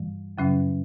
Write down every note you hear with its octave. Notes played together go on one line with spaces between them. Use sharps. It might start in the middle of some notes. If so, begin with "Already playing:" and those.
Already playing: G2 E3 G3
F#2 C#3 F#3 C#4